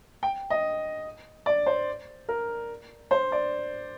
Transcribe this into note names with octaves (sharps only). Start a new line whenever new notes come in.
G5
D#5
D5
C5
A#4
C5
D5